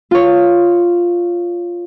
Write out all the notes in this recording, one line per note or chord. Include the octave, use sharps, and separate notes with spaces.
F4 C#5